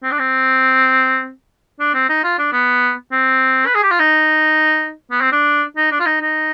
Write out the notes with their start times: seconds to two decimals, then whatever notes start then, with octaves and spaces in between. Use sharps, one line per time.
0.03 C4
0.12 D4
0.19 C4
1.80 D4
1.94 C4
2.09 D#4
2.24 F4
2.39 D4
2.53 B3
3.12 C4
3.66 B4
3.75 G#4
3.83 G4
3.91 F4
4.00 D#4
5.11 B3
5.21 C4
5.32 D4
5.77 D#4
5.91 D4
6.00 F4
6.06 D#4
6.21 D#4